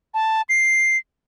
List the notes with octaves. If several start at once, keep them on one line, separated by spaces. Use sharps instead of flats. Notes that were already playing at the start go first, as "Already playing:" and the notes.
A5
C7